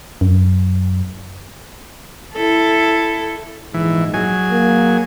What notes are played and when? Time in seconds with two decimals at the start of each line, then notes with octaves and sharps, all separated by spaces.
0.21 F#2
2.34 E4 A4
3.74 A#1 G#2 E3
4.14 F#3 G#4 G#5
4.51 A#3